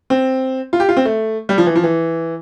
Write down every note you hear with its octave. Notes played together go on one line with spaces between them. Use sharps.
C4
F4
G4
F4
C4
A3
G3
F3
E3
F3
E3